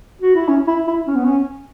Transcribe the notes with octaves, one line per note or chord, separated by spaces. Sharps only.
F#4
E4
C#4
E4
E4
C#4
B3
C#4